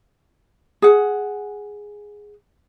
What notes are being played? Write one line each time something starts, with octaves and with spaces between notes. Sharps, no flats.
G#4 F#5